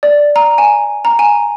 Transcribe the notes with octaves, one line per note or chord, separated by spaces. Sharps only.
D5
A#5
G#5
A#5
G#5